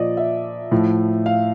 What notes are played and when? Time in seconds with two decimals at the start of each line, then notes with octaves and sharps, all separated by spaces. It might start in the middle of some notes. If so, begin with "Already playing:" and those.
Already playing: A#2 F3 D5 D#5
0.17 E5
0.71 A2 F3
1.26 F5